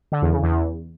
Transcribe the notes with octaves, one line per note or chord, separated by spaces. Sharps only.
D3
E2
C#3
E2